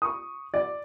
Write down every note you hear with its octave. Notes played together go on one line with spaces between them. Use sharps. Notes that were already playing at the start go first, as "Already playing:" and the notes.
C#6 D#6
D5